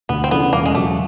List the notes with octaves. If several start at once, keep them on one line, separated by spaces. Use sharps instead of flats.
D2 B3
C4
C#3 E3 A3 B3 D4
E1 A#3
G#3
E2 C#3 F#3 A3